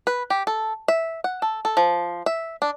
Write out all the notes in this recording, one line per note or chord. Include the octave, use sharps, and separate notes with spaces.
B4
G4
A4
E5
F#5
A4
A4
F3
E5
D4